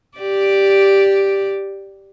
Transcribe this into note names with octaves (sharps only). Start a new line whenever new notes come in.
G4 D5